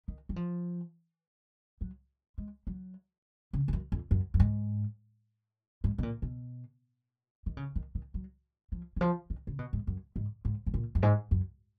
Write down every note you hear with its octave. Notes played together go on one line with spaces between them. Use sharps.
D#3
F#3
F3
F#3
G#3
F#3
C#3
G#2
F#2
F2
F#2
F#2
G#2
G#2
B2
A#2
B2
D#3
C#3
D#3
D#3
F#3
F3
D#3
F3
D#3
C#3
B2
G#2
F#2
G#2
G#2
G#2
A#2
F#2
G#2
F#2